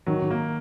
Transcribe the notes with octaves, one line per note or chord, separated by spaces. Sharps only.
D#3 F#3
D#3
A#3